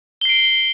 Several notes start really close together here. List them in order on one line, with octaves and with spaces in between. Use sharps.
G7 C7 D7